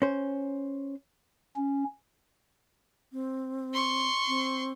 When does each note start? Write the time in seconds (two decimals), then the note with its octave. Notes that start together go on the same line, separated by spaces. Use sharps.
0.02 C#4 C5
1.56 C#4
3.13 C4
3.74 C6 C#6
4.28 C4